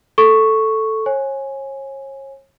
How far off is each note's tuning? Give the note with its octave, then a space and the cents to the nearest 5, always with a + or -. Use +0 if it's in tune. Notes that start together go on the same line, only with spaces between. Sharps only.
A4 +0 C#6 +0
C#5 -35 G#5 +0